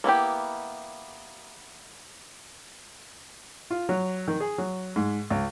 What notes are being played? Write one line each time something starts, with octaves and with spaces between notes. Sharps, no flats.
A#3 B3 E4 G4
F4
F#3
D#3
G#4
F#3
G#2
C#2